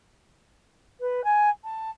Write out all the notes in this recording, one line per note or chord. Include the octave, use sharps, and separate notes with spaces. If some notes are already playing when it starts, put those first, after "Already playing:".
B4
G#5
A5